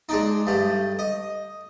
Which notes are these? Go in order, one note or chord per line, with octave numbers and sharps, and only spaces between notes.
G#3 D4 D#4
G2 A3
D#5